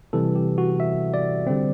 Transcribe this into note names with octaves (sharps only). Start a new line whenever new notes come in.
C3 E3 G3 A4
G4
F#4
E5
D5
D3 G3 C4